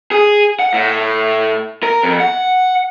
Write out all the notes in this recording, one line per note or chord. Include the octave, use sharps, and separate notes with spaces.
G#4
F#5
A2
A#4
F2
F#5